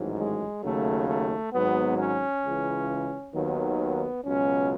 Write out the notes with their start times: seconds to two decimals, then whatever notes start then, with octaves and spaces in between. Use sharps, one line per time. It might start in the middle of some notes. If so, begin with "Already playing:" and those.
Already playing: A1 G#2 D#3 F#3
0.17 G#3
0.63 D#2 C#3 F#3 A3
1.08 A3
1.53 G#1 G#2 F#3 B3
1.98 C#4
2.43 C#2 C#3 E3
3.33 D#2 D#3 F#3 B3
4.24 C#2 B2 F#3 C#4